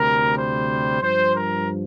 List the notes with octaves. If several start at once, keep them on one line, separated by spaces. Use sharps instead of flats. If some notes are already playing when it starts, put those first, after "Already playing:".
Already playing: D2 C3 G3 A#4
C5
G2 F3 C5
A#4